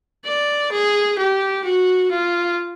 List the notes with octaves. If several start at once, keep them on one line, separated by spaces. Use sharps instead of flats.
D5
G#4
G4
F#4
F4